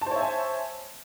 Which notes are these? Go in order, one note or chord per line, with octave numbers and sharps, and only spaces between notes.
C5 C#5 E5 G#5 A5